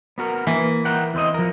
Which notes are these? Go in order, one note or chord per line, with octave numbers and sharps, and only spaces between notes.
B3 F#4 A#4
E3 A#3
A#4 F#5 G5
E2 C4 D#5
F3 A#4